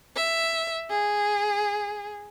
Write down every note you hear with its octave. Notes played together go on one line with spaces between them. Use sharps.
E5
G#4